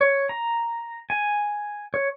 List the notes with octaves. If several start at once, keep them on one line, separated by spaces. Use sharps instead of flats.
C#5
A#5
G#5
C#5